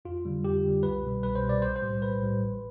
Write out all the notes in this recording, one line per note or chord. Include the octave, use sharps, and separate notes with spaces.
F2 F4
D3 G3
F2 G4
D3 G3
C2 B4
B2 G3
C2 B4
C5
B2 G3
D5
B1 C5
C5
A2 G3
B1 B4
A2 G3
A1